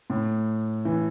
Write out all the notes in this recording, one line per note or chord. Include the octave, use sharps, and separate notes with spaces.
A2
E3